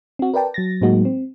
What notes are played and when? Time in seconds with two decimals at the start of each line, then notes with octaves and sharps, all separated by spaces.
0.19 C4 F#4
0.34 A#4 B4 D5 G5 A5
0.54 F#3 A6 A#6
0.81 A2 F#3 G#3 A#3 D#4 F#4
1.05 C4